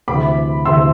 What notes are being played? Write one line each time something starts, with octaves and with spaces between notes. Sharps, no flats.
D2 C3 E3 B5 D6
D2 C3 E3 C6 E6